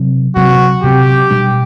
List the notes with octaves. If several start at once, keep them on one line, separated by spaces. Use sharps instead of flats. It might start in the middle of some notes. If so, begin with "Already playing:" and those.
Already playing: C3 F#3 C4
C3 F#3 C4 F#4
C3 F#3 C4 G4
B2 G3 D4